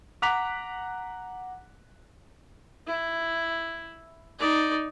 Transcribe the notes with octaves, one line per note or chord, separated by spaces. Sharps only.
F#5 A#5 D6 F#6 B6 F7
E4
D#4 D5